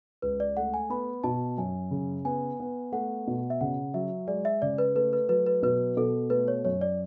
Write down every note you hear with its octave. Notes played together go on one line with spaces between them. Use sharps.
C#2 B4
D5
A3 F#5
G#5
B3 B5
B2 A5
F#2 G#5
C#3
B3 G#5
B3
A3 F#5
B2
E5
C#3 F#5
F#3 E5
G#3 D5
E5
C#3 D5
B4
A3 B4
B4
F#3 B4
B4
B2 B4
B2 A4
A3 B4
C#5
F#2 C#5
D5